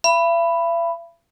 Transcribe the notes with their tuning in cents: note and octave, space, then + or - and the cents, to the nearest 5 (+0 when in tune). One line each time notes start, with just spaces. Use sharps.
E5 +45 B5 +5